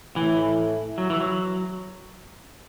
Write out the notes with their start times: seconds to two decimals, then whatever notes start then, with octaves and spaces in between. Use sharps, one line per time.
0.16 A2 E3 A3 E4
0.98 F#3
1.10 E3
1.20 F#3